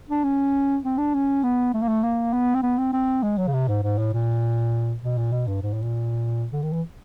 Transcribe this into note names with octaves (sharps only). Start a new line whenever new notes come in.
D4
C#4
C4
D4
C#4
B3
A3
A#3
A3
A#3
B3
C4
B3
C4
C4
G#3
F#3
C#3
C3
G#2
G#2
A2
A#2
B2
A#2
B2
G2
G#2
A2
A#2
D3
D#3
E3